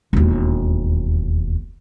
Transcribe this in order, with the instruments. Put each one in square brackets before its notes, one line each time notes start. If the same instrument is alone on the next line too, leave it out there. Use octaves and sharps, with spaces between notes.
[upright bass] E1 D#2